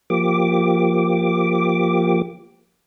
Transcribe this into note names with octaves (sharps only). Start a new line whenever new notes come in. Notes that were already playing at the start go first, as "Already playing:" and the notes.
F3 A#3 G4 D6